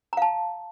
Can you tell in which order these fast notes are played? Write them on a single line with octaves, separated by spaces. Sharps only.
A#5 F5 A5